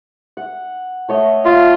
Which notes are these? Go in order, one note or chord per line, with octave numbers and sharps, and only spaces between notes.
F#5
A3 C#5 D#5
F4 E5